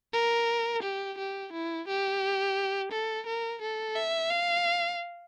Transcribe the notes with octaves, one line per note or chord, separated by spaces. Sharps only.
A#4
G4
G4
E4
G4
A4
A#4
A4
E5
F5